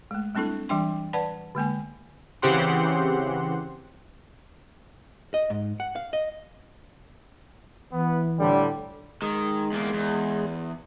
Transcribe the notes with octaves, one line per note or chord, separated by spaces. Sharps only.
G#3 A3
G3 A3 C4 D4 E4 A4
E3 G3 D4 G5 C6
B4 D5 F#5 A5 B5
D3 G#3 A#3 G#5
C#3 E3 C4 G4 F#5 C6
D#5
G#2
F#5
F5
D#5
E3 B3
A2 D3 G3
D#3 G#3
E2 A#3
E2